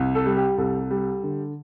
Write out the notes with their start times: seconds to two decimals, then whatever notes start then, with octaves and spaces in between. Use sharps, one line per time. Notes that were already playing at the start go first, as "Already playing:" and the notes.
Already playing: C2
0.15 A4
0.26 G3
0.37 G4
0.58 C2 A4
0.90 G3
1.23 D3